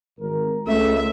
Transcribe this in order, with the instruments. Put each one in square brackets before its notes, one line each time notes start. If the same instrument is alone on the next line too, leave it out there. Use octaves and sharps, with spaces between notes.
[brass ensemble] G#1 A#4
[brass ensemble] C#2 [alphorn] A3 [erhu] E5